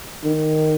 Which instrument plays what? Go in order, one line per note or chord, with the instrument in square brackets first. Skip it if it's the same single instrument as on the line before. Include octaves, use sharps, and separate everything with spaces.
[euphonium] D#3